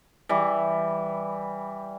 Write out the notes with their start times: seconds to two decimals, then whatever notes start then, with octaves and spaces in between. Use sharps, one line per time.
0.29 E3 G3